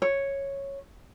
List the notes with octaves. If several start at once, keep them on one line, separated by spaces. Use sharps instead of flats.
C#5